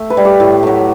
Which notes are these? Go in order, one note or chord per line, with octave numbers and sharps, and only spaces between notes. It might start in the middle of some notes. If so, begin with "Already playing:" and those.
Already playing: A3 E5 G5
B4
G3
G4
A2
F#3 A3